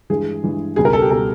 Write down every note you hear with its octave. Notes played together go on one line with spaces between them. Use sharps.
G2 E3 G#3 G#4
G2 E3 G#3
C#2 B2 G3 G#4
A#4
A4
G4
B2 G3 A4